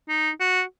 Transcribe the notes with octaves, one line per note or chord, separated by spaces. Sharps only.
D#4
F#4